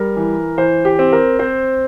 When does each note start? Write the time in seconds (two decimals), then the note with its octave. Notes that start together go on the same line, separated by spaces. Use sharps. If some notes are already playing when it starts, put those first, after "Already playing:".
Already playing: G3 A#4
0.17 E3
0.58 E3 C5
0.85 G4
0.99 C4
1.13 A#4
1.39 C4 C5